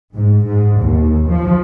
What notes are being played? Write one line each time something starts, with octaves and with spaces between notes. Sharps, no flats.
G#2
G#2
D#2
F3